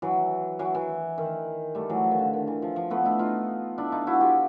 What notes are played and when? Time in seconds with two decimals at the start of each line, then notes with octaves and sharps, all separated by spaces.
0.02 E3 F#3
0.59 E3 F#3
0.75 E3
1.18 D#3
1.75 G3 A3
1.90 E3 F#3
2.04 F3
2.11 D#3
2.18 D3
2.33 D#3
2.47 E3
2.62 F3
2.76 F3
2.90 A3 B3
3.05 D4 E4
3.19 D#4 F4
3.78 D4 E4
3.92 D#4 F4
4.07 E4 F#4
4.20 F4 G4